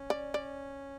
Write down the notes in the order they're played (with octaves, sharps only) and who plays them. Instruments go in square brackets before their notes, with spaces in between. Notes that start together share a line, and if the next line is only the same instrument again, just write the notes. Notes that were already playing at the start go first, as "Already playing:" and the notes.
Already playing: [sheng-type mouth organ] C#4
[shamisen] D5
D5